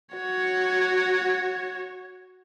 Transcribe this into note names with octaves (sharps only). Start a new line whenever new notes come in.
F#4 C#5